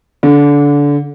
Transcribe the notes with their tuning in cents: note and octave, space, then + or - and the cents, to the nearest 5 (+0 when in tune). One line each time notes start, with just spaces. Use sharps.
D3 -25